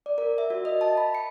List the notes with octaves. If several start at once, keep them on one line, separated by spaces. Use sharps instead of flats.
D5
A#4
E5
F#4
D#5
A5
B5
C#7